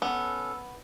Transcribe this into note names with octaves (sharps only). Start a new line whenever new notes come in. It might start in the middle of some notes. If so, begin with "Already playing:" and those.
B3 C#4 A4